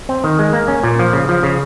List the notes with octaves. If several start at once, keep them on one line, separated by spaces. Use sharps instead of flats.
C4
D#3
G#3
A#3
C#4
A#2
F3
C#3
F3
C#3